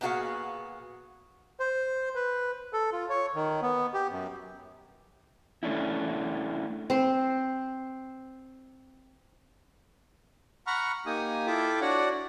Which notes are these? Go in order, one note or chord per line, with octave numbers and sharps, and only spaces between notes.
A#2 B3 D4 F#4 G#4 F5
C5
B4
A4
F4
C#5
D#3
B3
G4
F#2
A3 C#4 D4 E4
C4 C5
F#5 A#5 B5 C#6 F6
A#3 D#4 G4 G#5 D#6
E4 F4 A4 E5 G5 D6
D4 F#4 C#5 D5 F#5